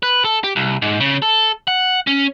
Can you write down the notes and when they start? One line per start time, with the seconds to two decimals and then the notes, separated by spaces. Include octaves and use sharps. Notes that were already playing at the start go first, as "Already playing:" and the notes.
0.03 B4
0.25 A4
0.44 G4
0.56 C2
0.82 G#2
1.00 C#3
1.22 A4
1.68 F#5
2.07 C#4